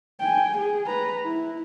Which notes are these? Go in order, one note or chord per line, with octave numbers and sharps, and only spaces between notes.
G5 G#5
G#4
B4 A#5
E4